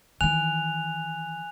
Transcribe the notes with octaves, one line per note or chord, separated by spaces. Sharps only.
D#3 E3 G#5 F#6 F7